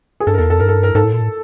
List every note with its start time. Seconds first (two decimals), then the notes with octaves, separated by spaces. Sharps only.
0.20 G#4
0.27 G2 A4
0.34 A#4
0.38 E2 A4
0.50 F2 A4
0.59 G2 A#4
0.69 A4
0.83 A#4
0.95 G#2 A4
1.04 A2
1.13 A#2
1.21 A2